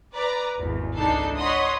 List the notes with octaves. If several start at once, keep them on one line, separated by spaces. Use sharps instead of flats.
B4 D5 A#5
G#1 E2
C#2 E3 D4 D#4 A4 C7
C#5 D#5 F#5 B5 C6 D#6